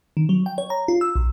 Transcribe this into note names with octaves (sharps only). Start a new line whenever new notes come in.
D#3
F#3
G5
C#5
A#5
F4
E6
B1